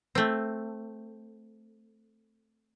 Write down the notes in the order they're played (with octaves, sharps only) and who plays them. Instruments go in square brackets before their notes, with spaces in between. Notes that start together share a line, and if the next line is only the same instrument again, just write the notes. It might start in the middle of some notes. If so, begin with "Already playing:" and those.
[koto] A3 C4